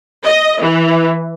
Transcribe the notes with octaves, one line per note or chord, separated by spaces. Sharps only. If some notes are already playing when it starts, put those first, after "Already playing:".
D#5
E3